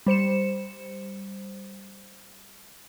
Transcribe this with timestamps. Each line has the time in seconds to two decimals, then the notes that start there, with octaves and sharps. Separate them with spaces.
0.06 G3 C5 C#7 E7